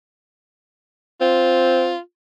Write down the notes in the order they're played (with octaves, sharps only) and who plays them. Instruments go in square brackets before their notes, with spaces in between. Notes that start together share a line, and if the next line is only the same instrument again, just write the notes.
[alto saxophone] C4 [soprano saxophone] F4